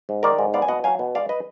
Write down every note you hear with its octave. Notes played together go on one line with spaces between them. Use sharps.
G#2
D#3 A#4 D5
G#2
B3 D5 F5
G#5
B2 D#5 F#5
F#3 F5 G#5
B2
G#3 D5 F5
B4 D#5